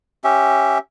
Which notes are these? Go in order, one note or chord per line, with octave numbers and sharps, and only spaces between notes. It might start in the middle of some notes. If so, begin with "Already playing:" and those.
C#4 G4 E5